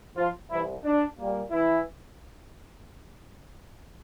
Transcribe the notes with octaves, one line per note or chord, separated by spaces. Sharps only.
F3 F4
C2 C3 E3 G3 E4
D4
A#2 G3 A#3
E3 E4